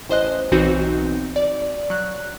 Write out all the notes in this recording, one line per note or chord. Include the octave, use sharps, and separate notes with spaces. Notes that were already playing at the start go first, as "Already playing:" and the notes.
A1 C5 D#5 F#6
B1 E3 C4 D#4 F#4 G6
D5
F#3 F#6